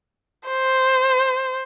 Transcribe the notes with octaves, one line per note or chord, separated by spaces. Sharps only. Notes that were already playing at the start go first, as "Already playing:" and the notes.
C5